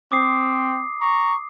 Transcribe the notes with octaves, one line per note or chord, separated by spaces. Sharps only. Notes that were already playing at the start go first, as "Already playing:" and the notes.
C4 D6 D#6 C7
A#5 C#6